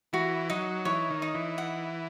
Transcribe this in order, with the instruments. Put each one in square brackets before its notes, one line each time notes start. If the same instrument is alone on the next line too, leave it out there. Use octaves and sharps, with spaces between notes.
[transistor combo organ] E3 [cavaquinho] F#4
[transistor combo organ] F#3 [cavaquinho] D#4
[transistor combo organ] E3 [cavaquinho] C#5
[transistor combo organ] D#3
[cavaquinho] D#4
[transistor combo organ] E3
[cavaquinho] F#5